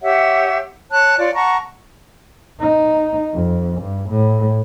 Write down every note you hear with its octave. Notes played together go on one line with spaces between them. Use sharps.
G4 C#5 E5 F#5
C#5 A5 F#6
F4 C#5 D5
F#5 A5 A#5 C#6
D#4
F2
G2
A2